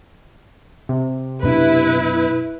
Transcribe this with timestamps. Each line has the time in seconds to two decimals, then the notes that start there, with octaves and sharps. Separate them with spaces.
0.89 C3
1.43 F#2 B2 D4 E4 B4